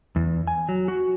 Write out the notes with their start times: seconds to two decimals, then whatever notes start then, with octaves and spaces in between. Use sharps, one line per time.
0.16 E2
0.47 G#5
0.69 F#3
0.88 F#4